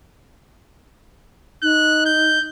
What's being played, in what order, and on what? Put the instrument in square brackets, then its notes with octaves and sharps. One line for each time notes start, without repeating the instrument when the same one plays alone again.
[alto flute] D#4 [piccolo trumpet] F#6
[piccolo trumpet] G6